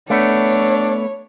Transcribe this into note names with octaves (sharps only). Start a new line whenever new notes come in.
A3 B3 D4 C#5